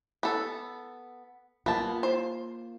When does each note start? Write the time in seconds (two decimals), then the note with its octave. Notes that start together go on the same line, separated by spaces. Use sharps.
0.23 B3 A4
1.66 A#3 B3 F4 A5
2.03 C5